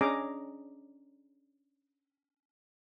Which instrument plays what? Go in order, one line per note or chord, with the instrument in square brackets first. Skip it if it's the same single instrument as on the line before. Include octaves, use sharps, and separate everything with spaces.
[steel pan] C#4 D4 G#4 D#5 A#5 D6